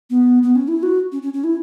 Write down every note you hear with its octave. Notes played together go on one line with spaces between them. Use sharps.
B3
B3
C#4
E4
F#4
C#4
C#4
C#4
E4